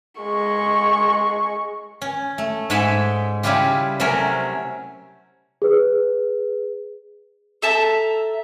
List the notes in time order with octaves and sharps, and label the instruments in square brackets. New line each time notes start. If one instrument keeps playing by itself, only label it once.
[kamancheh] G#3 C#6
[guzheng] C#4
A3
G#2 G#3 C#5 E5 B5 C6
C#3 G3 C#4 E4 F4 G4
C3 F#3 A3 C#4 A#4
[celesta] G#4 B4
[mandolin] A4 E5 A5 A#5